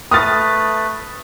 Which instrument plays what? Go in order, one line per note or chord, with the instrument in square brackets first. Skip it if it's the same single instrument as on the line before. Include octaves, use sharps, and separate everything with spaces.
[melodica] A3 B4 [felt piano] D#6 F6 A6